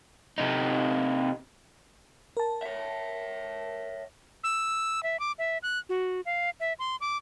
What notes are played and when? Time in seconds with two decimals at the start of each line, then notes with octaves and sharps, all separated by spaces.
0.38 C3 D#4
2.37 A#4 A5
2.62 C#5 E5
4.44 E6
5.03 E5
5.20 D6
5.39 E5
5.63 F#6
5.89 F#4
6.26 F5
6.60 E5
6.79 C6
7.01 D6